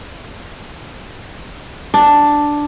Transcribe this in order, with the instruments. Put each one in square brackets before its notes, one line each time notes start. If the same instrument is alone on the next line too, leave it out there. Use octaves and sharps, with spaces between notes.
[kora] D4